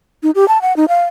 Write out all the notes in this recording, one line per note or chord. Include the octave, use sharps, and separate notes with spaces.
D#4
G4
A5
F#5
D#4
F5